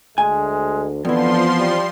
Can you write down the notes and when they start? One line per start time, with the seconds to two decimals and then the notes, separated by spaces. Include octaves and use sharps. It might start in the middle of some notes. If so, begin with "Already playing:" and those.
0.18 D2 G#3 G#5
1.05 F2 D3 E3 F3 B3 C6
1.59 G3